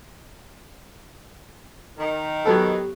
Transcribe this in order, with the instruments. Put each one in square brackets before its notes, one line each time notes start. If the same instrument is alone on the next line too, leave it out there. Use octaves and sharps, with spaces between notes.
[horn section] D#3
[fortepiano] F#3 B3 A4 [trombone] G4